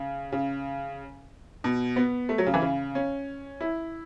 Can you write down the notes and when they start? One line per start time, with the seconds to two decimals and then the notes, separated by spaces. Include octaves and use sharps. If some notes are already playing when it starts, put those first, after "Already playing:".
Already playing: C#3
0.32 C#3
1.64 B2
1.96 B3
2.29 A3
2.38 F#3
2.46 C#3
2.54 E3
2.62 C#3
2.95 C#4
3.61 E4